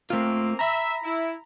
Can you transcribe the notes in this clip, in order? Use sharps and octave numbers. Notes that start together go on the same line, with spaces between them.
A3 A#3 C4 F4
E5 A#5 B5
E4